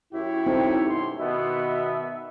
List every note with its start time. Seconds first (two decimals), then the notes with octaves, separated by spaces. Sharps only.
0.13 F#2 E4 G4 C#5
0.46 C4 D#4 A4
0.87 F#2 B2 C6
1.18 B2 D#3 B3 E5